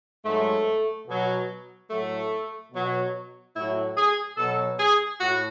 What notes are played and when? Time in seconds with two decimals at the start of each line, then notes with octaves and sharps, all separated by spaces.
0.25 G#2 F#3 A3
1.07 B2 F#3
1.89 A2 F#3 A3
2.72 B2 F#3
3.54 A2 F#3 E4
3.96 G#4
4.37 B2 F#3 A4
4.78 G#4
5.20 A2 F#4